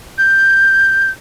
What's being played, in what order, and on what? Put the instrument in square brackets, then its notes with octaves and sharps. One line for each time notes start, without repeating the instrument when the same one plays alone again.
[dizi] G6